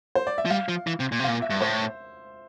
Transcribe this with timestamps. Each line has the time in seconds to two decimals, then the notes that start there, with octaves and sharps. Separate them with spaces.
0.15 C5
0.27 D5
0.38 E5
0.46 F3
0.50 G3 F5
0.68 F3
0.87 E3
1.00 C3
1.12 A#2
1.19 C3
1.24 F5
1.27 A#2
1.42 E5
1.50 G2
1.61 A2 C5